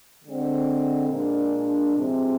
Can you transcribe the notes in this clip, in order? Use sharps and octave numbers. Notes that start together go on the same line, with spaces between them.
D3 G#3 C4
A#2 G#3 D4
C3 F3 G#3 C4